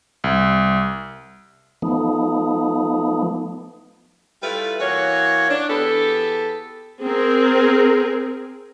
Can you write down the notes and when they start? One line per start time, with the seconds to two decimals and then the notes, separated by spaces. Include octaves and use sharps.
0.24 C2
1.82 F3 A3 B3 D#4
4.41 G3 A3 E4 F4 B4
4.80 E3 A#3 F#4 C#5
5.50 D4
5.68 E2 B3 G4 A4
7.03 C4 G#4 A#4